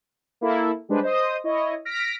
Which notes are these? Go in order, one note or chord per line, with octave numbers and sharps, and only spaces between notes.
A#3 E4 A4
G3 G#3 D4 B4 C5
C5 D#5 D#6
E4 C#5 D#5
F6 A#6 B6 D7